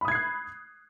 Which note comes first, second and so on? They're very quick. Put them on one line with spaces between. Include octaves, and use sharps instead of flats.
B5 D#6 G#6 C7 F#6